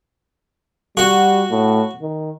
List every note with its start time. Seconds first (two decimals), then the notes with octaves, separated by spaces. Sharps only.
0.97 G3 F#4
1.50 A2
2.02 D#3